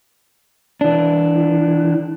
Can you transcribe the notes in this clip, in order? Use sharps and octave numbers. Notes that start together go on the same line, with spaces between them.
E3 D4